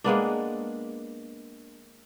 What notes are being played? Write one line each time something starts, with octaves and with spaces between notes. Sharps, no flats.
G#3 A#3 B3 D4